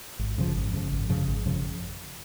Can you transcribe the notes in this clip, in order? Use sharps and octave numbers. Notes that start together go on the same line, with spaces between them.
G#1
F#2 C#3 F3
G#1
F#2 C#3 F3
G#1
F#2 C#3 F3
G#1
F#2 C#3 F3